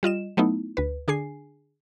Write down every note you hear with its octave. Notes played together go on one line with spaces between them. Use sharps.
G3 F4 D#5 E7
F#3 A3 B3 D#4 E4
D2 B4
D3 D4 G#4 G#5 C7